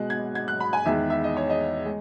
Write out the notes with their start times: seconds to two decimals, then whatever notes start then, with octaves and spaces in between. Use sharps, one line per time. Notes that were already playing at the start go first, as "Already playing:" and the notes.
Already playing: B2 G#3 F#6
0.10 G#6
0.35 G#6
0.48 F#6
0.60 B5
0.73 G#5
0.85 E2 D#3 G#3 E5
1.10 E5
1.24 D#5
1.37 C#5
1.50 D#5
1.86 G#3